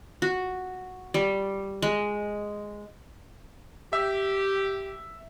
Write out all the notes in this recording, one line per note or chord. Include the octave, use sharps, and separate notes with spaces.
F#4
G3
G#3
G4 E5